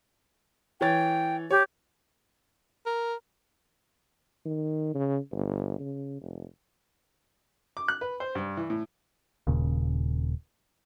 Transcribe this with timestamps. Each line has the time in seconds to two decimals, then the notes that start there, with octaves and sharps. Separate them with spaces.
0.81 E3 C#5 G5 A6
1.51 G4 C#5
2.86 A#4
4.46 D#3
4.94 C#3
5.32 G1
5.79 C#3
6.21 F1
7.77 D6
7.88 F#6
8.01 B4
8.20 C5
8.35 G2
8.57 E3
8.70 A2
9.47 D#1 D#2 A#2 C#3